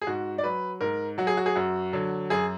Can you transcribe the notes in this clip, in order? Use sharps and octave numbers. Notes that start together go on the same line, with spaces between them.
G#4
G#2 F#4
D5
F#3 B4
G#2 A#4
F#3 F#4
G#4
F#4
G#4
F#2 F#4
D3 F#3
F#2 G#4